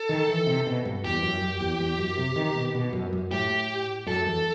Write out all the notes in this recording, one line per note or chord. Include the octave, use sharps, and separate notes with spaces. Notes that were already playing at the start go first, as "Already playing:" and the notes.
Already playing: A4
D#3
E3
C3
B2
G2
E2 G4
F#2
F#2
E2
E2
F#2
C3
D#3
B2
B2
F#2
F#2
A2 G4
F#2 A4
E2